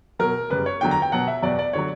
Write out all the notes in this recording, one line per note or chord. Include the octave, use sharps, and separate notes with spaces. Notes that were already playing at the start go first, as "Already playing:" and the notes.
B2 F#3 A#4
F#2 C#3 G3 B4
C#5
E2 D3 F#3 G5
A#5
G5
B2 F#3 F#5
E5
E2 B2 F#3 D5
D5
D3 F#3 C#5